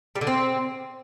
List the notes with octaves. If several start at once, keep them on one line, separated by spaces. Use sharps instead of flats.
G3
D3
C4